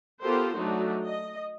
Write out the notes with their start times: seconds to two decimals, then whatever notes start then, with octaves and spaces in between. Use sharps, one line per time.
0.22 B3 F4 G4 A4 A#4 C5
0.55 F#3 A3 D4 D#4 F#4
1.06 D#5